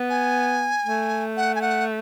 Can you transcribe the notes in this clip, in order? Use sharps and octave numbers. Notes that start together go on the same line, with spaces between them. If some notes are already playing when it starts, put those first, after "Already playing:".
Already playing: B3
G#5
A3
F#5
G#5
F#5